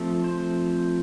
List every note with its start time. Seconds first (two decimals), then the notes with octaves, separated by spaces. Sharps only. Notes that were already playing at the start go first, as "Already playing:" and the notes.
Already playing: F3 A3 C4
0.24 C5